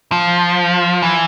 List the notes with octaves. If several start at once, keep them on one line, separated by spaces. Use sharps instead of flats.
F3
E3